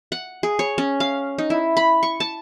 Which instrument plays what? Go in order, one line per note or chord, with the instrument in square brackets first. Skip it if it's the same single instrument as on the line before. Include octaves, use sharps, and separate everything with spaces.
[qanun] F#5
G#4
C#5
C#4
F5
D#4
E4
B5
C#6
A5